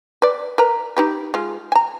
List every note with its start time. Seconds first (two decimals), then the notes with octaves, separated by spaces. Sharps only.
0.22 B4 D5
0.58 A#4 B4 A#5
0.97 D#4 G4 B4
1.34 G#3 F4
1.72 G#5 A#5